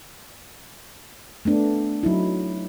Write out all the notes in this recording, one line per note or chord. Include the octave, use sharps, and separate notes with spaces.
A3 B3 D4
F#3 D#4 E4